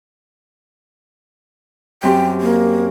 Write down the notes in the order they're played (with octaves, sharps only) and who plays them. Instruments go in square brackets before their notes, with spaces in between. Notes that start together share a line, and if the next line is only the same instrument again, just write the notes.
[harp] F#2 C4 G4 [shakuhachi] G5
[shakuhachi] A#3